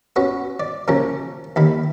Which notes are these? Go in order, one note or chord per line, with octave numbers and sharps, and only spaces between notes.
B3 C#4 F#4 B4
D5
C#3 F3 A#3 C#4 G#4 A#4
D#2 D#3 B5